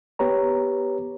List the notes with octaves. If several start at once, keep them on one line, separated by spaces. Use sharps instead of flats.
B3 G4 B4 C#5 A#5